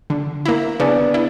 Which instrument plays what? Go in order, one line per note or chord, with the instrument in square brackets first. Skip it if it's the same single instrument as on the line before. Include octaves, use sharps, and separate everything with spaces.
[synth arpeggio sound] D3
A#3 E4
[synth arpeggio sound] C#3 [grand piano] B3 D4
[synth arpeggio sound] E4